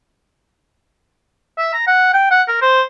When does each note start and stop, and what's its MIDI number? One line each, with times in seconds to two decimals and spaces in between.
1.58 1.69 76
1.74 1.86 82
1.87 2.13 78
2.14 2.30 79
2.31 2.42 78
2.48 2.60 70
2.62 2.82 72